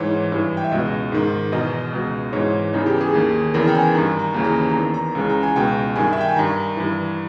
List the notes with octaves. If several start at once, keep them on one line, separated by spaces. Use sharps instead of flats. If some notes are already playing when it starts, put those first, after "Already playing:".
Already playing: G#2 E3 C#5
G2 E3
G5
E5
C#2 B2 D#5
G#2 D#3
E2 B2 D#5
C#2 B2
G#2 E3 C#5
E2 C#3 E3 D#4
G4
G#4
D#2 D#3
E2 C#3 E3 A#4
G5
G#5
G2 D#3 A#5
A#5
D#2 C#3 E3
A#5
A#5
E2 D#3
A#5
C#2 C#3 E3
A#5
G#5
C#2 B2 G5
G2 D#3 G#5
E5
G5
G#5
G2 D#3 A#5
G2 E3